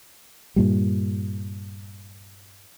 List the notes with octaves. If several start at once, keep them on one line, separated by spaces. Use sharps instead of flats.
G2 A#2 G3